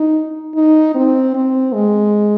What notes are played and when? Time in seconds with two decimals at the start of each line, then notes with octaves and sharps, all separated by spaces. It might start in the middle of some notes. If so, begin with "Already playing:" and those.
Already playing: D#4
0.55 D#4
0.95 C4
1.35 C4
1.74 G#3